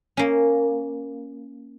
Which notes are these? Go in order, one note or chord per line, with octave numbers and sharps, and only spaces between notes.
A#3 C#4